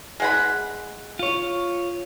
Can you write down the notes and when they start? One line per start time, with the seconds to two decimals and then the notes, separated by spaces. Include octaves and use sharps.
0.20 G#3 F#5 B5
1.19 F4 C#5